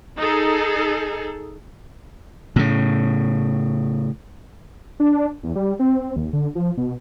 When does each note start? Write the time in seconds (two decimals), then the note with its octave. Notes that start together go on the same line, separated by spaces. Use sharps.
0.19 D#4 G#4 A4
2.56 A2 C#3
5.00 D4
5.43 E2
5.56 G3
5.79 C4
6.16 D#2
6.33 D3
6.55 F3
6.77 B2